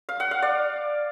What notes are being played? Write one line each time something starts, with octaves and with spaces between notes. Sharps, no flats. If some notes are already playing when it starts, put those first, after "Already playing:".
F5
F#5
F5
D5